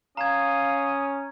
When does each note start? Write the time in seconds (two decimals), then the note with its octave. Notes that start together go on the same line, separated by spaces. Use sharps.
0.17 C#4 F5 A#5 D#6 G#6